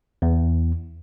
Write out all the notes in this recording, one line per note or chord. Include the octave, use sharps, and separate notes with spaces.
E2